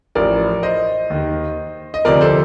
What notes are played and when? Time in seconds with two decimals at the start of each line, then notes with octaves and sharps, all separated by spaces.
0.15 A1 A2 F3 A#4 D5
0.63 C5 D#5
1.10 D#2 D#3
1.94 D#5
2.05 D2 C3 F3 A#4 D5
2.21 A4 C5